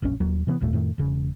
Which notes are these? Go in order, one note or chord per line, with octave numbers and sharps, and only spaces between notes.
E1 A#1 F#2 C#4
D#1 D#2 F#3
C3 E3 A#3 B3
G1 D#2 A#2 A3
F2 A2 D#3 A3
E1 C#3